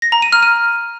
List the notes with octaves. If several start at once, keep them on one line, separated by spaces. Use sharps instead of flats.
A#6
A#5
D#7
F6
D#7